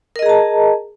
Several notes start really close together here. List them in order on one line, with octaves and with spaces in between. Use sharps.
A#4 D#5 G#4 A#5 A5